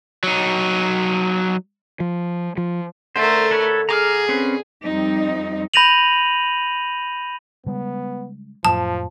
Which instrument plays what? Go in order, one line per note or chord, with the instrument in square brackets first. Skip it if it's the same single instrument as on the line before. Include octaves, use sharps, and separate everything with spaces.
[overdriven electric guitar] F#3 D#4
[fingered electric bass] F3
F3
[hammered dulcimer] D3 [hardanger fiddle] A3 A#4 [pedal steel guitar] C5
[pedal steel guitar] A4 B4 C#5
[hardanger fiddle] G#4 [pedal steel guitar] A#5 D6 F6
[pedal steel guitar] C4 C#4 B4
[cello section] F2 G3 C4 D#4
[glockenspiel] B5 G6 A#6 D#7 F7 F#7
[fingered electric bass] C#3 G3 G#3 [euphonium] B3
[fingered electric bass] F2 A2 F#3 [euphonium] F3 [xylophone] A5